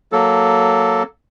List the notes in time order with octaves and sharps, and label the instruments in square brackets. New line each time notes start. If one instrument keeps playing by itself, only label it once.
[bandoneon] F#3 A#3 A4